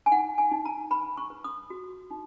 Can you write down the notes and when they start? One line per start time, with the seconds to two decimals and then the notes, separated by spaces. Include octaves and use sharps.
0.06 G#5
0.12 D#4 F#5
0.38 G#5
0.52 D#4
0.65 A#5
0.91 B4 B5
1.17 C#6
1.30 B4
1.44 D#6
1.70 F#4
2.11 D#4